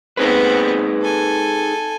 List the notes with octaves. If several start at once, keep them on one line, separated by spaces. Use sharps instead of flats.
B3 C4 D#4 G#4 B4
A4 G#5